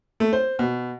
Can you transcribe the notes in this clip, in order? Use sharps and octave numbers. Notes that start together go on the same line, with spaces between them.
A3
C5
B2